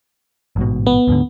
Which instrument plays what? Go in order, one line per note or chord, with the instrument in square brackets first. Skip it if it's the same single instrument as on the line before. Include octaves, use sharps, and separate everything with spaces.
[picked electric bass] A1 G#2 B2
[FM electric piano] B3
[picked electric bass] D2 G#2 D3